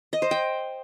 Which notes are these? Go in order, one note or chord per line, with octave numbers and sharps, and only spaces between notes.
D#5
C5
G5